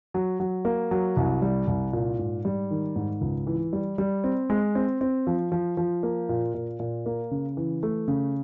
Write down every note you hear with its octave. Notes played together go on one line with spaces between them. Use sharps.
F#3
F#3
A#3
F#3
C2
G3
C2
A#2
G#2
G3
D#3
G#2
C#2
E3
G3
G3
C4
G#3
C4
C4
F3
F3
F3
A#3
A#2
A#2
A#2
A#3
C#3
E3
A3
C#3